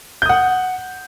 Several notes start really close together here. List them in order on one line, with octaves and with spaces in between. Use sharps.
G6 D#6 F#5